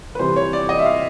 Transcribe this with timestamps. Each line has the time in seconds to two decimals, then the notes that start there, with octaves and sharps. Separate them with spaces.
0.15 B4
0.19 C3 E3 G3 C5
0.36 C#5
0.53 D5
0.69 D#5
0.79 E5
0.86 F5